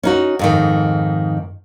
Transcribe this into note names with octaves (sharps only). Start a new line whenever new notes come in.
C#4 D#4 F#4
F2 G#2 D#3